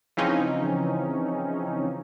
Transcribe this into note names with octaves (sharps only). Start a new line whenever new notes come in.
C#3 E3 F3 C4 C#4 D#4